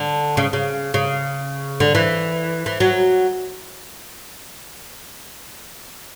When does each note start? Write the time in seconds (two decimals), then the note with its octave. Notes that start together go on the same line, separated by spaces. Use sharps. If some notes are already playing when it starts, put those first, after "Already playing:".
Already playing: D3
0.37 C#3
0.53 C#3
0.94 C#3
1.80 D3
1.95 E3
2.66 E3
2.80 F#3